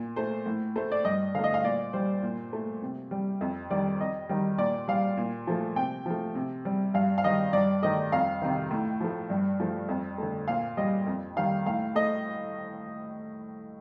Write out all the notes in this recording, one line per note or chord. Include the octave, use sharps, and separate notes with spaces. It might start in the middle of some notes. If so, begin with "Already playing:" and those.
Already playing: A#2
A3 C5
A2
A3 C5
D5
G2 D#5
D3 A3 F5
D#5
F5
A#2 D5
G3 C5
A#2
A3
C3
G3
F2
D#3 G3 D5
F2 D#5
D#3 G3
A#2 D5
G3 F5
A#2
F3 A3
C3 G5
F3 A3
C3
G3
G2 F5
F5
D#3 G3 D#5
G2 D5
D#3 A3 D#5
F2 F5
C3 D#3
A2
F3 A3
G2
F3 A3
F2
D3 A3
A#2 F5
G3 D#5
F2
D#3 G3 F5
A2 F5
A3 D#5